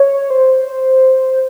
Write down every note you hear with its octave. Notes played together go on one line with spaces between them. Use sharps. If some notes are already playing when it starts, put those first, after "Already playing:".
Already playing: C#5
C5